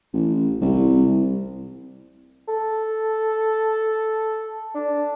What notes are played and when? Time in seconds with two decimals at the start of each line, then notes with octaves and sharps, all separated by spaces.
0.13 A1
0.61 C2
2.48 A4
4.75 D4